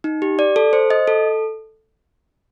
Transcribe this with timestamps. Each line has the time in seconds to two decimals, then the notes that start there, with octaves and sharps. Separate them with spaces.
0.04 D#4
0.22 G4
0.39 D5
0.56 A4
0.73 C5
0.90 D#5
1.08 A4